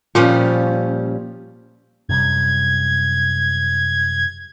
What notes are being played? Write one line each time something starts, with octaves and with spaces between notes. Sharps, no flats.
A#2 F3 G3 C#4
F#2 C3 G3 G#6